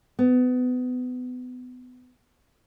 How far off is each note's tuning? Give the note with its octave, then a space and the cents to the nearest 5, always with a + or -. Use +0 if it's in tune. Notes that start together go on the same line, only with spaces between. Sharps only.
B3 +25